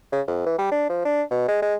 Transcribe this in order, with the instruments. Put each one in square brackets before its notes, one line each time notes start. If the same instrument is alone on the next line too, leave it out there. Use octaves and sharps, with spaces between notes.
[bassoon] C#3
F2
E3
G3
D4
F3
D4
B2
G#3
G#3